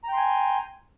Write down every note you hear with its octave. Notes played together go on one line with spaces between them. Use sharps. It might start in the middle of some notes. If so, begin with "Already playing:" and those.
G5 G#5 A#5 C6